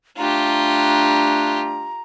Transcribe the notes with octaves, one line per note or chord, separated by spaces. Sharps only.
G3 A3 D4 F4 G4 A#5